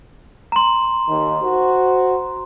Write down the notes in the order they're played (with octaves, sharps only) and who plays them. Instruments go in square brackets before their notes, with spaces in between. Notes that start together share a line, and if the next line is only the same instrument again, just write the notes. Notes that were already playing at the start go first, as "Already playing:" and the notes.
[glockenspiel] A#5 C6
[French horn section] D#2
F#4 C5